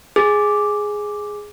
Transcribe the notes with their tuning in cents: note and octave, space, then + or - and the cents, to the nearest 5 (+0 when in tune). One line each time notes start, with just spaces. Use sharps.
G#4 +0 D6 +0